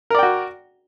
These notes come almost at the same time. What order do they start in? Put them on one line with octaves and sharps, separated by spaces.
A#4 D5 G5 F#4